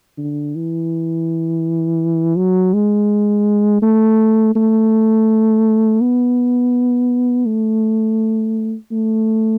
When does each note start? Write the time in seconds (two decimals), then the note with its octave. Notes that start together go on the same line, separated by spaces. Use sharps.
0.18 D3
0.56 E3
2.36 F#3
2.74 G#3
3.82 A3
4.55 A3
6.01 B3
7.46 A3
8.91 A3